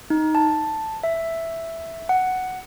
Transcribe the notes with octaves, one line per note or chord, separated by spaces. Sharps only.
D#4
A5
E5
F#5